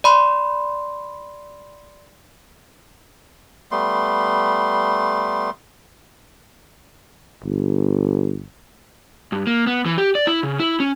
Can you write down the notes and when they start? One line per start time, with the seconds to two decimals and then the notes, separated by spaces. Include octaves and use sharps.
0.04 D5 B5 C6
3.71 G3 A3 B3 C6
7.44 G1
9.32 G2
9.47 A#3
9.67 B3
9.86 E3
9.98 G4
10.15 D5
10.27 E4
10.43 C#3
10.60 E4
10.80 C#4